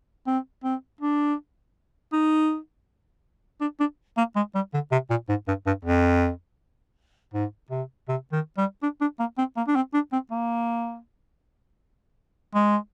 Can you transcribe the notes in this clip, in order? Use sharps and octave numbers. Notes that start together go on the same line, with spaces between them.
C4
C4
D4
D#4
D4
D4
A#3
G#3
G3
D3
C3
A#2
G#2
G2
G2
F2
G#2
C3
C3
D#3
G3
D4
D4
A#3
C4
A#3
D4
C4
D4
C4
A#3
G#3